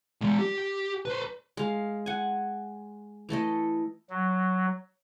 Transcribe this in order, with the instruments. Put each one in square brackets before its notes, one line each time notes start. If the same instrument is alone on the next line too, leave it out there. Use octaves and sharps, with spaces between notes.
[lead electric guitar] E3 G#3
G4
B4 C5
[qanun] G#3 F5
F#5 G#5
E3 A3 A4 D#5
[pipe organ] F#3